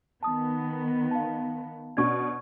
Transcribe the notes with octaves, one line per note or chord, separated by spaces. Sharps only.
D#3 B3 A5 D#6
F5 A5
B2 C#4 D4 D5 C#6 G#6